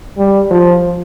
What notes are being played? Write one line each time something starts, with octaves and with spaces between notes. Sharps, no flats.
G3
F3